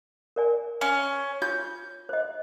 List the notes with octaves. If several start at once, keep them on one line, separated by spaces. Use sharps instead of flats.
A#4 D5 G#5
C#4
F4 G6
C5 D#5